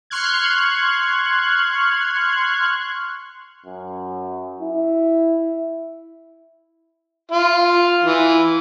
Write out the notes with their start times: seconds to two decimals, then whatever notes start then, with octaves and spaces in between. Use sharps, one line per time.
0.10 C6 C#6 F6 F#6 G#6
3.66 F#2
4.61 E4
7.31 F4
8.03 E3